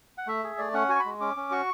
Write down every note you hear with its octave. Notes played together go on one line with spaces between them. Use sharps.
F#5
A3 E5
G#4
A3 D5
C#4 F#5
F#4 G#5
C#6
B5
G#3
C#4 D6
C#4
F#4 C#6